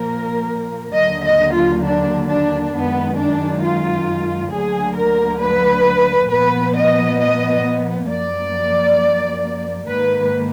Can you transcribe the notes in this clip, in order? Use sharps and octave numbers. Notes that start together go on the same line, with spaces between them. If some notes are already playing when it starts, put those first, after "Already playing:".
Already playing: A#2 F3 A#3 A#4
D#2 D3 F#3 A#3 D#5
D#5
F4
D4
D4
F#2 D#3 G#3 B3
D4
F4
D2 D3 F#3 A#3 G#4
A#4
B4
A#2 F3 B3 B4
D#5
D#5
F#2 F3 A#3 D5
G#2 D#3 A#3 B4